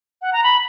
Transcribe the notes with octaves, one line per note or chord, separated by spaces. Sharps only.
F#5
A#5
B5